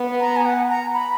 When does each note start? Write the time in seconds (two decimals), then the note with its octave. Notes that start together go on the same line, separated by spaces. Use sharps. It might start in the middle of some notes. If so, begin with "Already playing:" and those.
Already playing: B3
0.20 A#5
0.37 G#5
0.45 F#5
0.69 A#5
0.94 B5